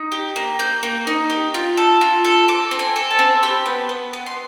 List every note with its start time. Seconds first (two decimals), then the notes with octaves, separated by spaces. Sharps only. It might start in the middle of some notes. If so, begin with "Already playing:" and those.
Already playing: D#4
0.12 G4
0.36 A#3
0.59 A#3 G6
0.83 A#3
1.07 D#4
1.30 G4
1.54 F4
1.77 A4
2.01 F4
2.25 A4
2.48 A4 D6
2.71 C4
2.79 G#5
2.96 A4
3.11 A5
3.19 C4
3.43 G4 B5
3.66 B3
3.89 B3
4.13 B3
4.26 C6